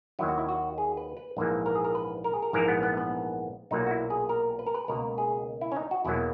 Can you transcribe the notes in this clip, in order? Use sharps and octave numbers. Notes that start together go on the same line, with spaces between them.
D#2 D#3 F#3 E4
F#4
E4
F#4
G#4
B4
B4
A#1 G#2 E3 A#3
A#4
G#4
A#4
B4
A#4
G#4
A#4
A#1 G#2 E3 A#3 A#4
B3
B3
B3
B1 A#2 F#3 A#3 D#4
F#4
E4
G#4
A#4
B4
A#4
B4
C#2 B2 A#3 A#4
G#4
E4
C#4
D#4
F#4
E2 B2 F#3 A#3 E4